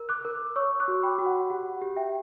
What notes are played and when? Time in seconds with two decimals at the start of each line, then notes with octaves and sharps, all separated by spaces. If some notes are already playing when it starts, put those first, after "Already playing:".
Already playing: A#4
0.09 D6 F#6
0.25 A#4
0.56 C#5 C#6 E6
0.80 D6 F#6
0.88 F#4
1.03 G5 B5
1.18 F#4
1.26 F#5
1.50 G4 F#5
1.82 G4
1.96 E5 G5